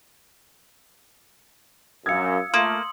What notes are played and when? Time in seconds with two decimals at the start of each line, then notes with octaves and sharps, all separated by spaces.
2.06 F#2 F5 D#6 E6 G#6 C#7
2.54 A3 A#3 F4 C6 D#6 F#7